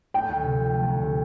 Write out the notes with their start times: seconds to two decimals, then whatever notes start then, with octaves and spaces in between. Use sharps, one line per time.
0.14 A3 G5
0.29 D2
0.43 C3
0.59 F3
0.74 A3
0.88 D2
1.03 C3